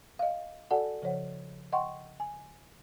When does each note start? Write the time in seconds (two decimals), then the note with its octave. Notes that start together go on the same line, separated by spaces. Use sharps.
0.19 D#5 F5
0.71 F#4 A4 D5 F#5 G#5 A5
1.02 C#3 F3 C5 C#5 F#5
1.72 D#5 F#5 G5 C6 C#6
2.20 G#5